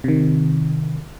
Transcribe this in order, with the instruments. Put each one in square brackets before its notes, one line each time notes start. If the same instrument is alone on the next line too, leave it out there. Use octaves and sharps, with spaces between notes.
[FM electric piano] C3 D#3